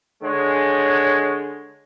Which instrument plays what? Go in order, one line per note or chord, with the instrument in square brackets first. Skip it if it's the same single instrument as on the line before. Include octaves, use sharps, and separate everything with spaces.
[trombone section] D3 G#3 [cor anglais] C#5